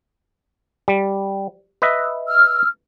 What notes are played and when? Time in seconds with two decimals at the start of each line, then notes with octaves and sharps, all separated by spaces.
0.88 G3
1.82 B4 D#5 E5
2.27 E6 F6